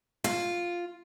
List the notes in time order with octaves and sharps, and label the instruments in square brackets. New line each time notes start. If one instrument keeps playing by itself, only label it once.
[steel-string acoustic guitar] F4